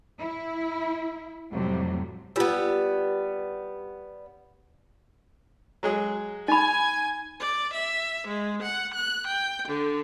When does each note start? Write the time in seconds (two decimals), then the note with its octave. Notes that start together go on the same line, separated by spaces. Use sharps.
0.19 E4
1.53 F2 A2 C3 F#3 G3 A3
2.36 G3 B3 F4 G#5 E6
5.83 F#3 G#3 G#4
6.48 D#4 G#5 B5 G#6
7.40 D5
7.74 E5
8.28 G#3
8.63 F#5
8.95 F#6
9.28 G5
9.68 D3